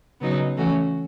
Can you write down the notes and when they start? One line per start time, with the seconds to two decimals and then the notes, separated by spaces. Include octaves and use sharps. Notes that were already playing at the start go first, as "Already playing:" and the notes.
0.21 C#3 F#3 B3 D#4
0.56 E3 A3 C#4 F#4